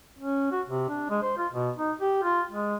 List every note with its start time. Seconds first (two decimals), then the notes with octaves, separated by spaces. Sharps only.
0.19 C#4
0.52 F#4
0.67 C3
0.89 D4
1.10 G#3
1.22 C5
1.37 F4
1.53 B2
1.77 D#4
2.01 G4
2.23 F4
2.51 G#3